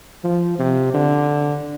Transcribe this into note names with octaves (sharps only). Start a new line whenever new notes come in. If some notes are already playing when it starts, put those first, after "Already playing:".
F3
C3
D3